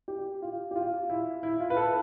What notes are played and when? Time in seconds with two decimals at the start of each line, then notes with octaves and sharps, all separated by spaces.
0.08 G4
0.42 F4
0.71 G4
0.76 F4
1.10 E4
1.43 E4
1.60 F4
1.70 B4
1.77 A4